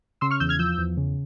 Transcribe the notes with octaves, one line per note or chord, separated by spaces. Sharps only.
C#3 C6 E6
C#6 F6
E2 E6 G6
F6 G#6
F3 E6 G6
E2
C#3